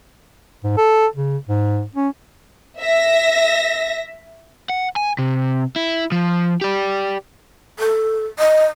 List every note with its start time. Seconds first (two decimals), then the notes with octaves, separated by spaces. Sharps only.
0.64 G#2
0.77 A4
1.16 C#3
1.49 G#2
1.95 C#4
2.80 E5 A#6
4.70 F#5
4.96 G#5
5.19 C3
5.76 E4
6.12 F3
6.61 G4 D5
7.79 A4
8.39 D#5